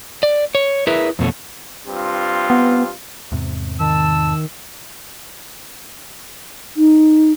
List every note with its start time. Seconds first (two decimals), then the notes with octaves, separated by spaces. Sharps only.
0.23 D5
0.55 C#5
0.87 E4 G#4 A#4 B4 E5
1.19 F2 B2 A3 C#4
1.86 G2 C4 F4
2.50 B3
3.32 E2 G#2 C3
3.80 D#3 A5 E6
6.77 D#4